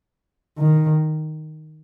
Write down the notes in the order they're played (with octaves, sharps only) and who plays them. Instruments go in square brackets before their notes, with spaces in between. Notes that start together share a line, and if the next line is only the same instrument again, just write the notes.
[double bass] D#3